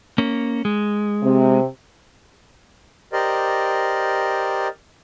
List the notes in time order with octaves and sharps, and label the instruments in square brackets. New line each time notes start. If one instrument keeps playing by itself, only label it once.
[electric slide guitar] A#3 C#4
G#3
[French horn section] C3
[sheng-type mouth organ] G4 A#4 C5 D5 D#5